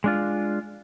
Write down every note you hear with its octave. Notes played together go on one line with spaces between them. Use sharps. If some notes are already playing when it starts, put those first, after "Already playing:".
G#3 D4 F4